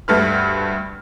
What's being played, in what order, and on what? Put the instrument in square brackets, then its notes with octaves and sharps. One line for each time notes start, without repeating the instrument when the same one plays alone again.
[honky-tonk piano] D2 G2 A3 B4 F6